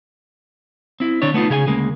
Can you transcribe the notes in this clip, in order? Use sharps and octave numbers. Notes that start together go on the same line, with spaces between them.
C4 E4
D3 C4 D4 C#5
A3 B3 D#4 F4
C#3 G#4 E5 G#5
D2 C#3 G#3 A#3